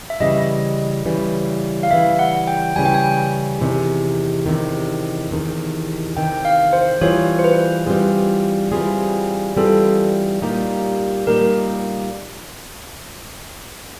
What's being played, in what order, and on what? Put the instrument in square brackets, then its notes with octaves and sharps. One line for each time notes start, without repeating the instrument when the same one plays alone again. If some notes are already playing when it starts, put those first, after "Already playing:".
[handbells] E5
[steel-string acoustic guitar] C#3 E3 G3 [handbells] D#5
[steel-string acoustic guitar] C#3 E3 G3
[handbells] F5
[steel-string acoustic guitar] C#3 E3 G3 [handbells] E5
[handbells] F#5
G5
[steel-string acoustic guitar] C#3 E3 G3 [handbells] G#5
[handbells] G5
G#5
[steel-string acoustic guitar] E2 C3 D#3
E2 C3 D#3
E2 C3 D#3
[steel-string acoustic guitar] E2 C3 D#3 [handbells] G5
[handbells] F5
C5
[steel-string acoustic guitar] E3 G3 C4 F4 G#4 [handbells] C#5
[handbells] C5
B4
[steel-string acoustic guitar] E3 G3 C4 F4 G#4
E3 G3 C4 F4 G#4
[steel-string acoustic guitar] E3 G3 C4 F4 G#4 [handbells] A4
[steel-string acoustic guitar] A#2 G3 A#3 D#4 G4
[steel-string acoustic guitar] A#2 G3 A#3 D#4 G4 [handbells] A#4